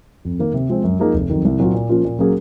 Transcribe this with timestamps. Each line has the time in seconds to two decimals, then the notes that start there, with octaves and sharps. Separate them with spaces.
0.25 F2
0.39 D#3 A#3
0.54 C3
0.70 F3 G#3 C4
0.84 F#2
1.00 F3 A#3 D#4 G#4
1.14 F1
1.29 F2 D#3 F#3
1.45 C2
1.59 A#2 F#3 C4 F4
1.74 A#2
1.89 F3 A#3 C#4 F4
2.05 A#2
2.19 F#3 A#3 C#4 G#4